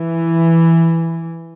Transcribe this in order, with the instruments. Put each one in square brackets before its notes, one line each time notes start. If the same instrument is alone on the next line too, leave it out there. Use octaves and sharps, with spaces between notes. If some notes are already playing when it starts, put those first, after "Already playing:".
Already playing: [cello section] E3